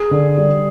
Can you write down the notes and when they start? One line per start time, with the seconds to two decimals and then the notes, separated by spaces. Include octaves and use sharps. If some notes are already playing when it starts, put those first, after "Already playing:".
Already playing: G#4
0.11 D3
0.37 G3